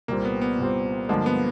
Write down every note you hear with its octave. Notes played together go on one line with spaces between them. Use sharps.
C2 A#2 G3 A#3 C4
B3
B3
C2 A#2 G3 C4
G2 D3 F3 G#3 A#3
B3